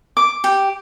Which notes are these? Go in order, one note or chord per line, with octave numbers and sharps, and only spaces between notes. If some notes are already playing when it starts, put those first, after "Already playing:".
D6
G4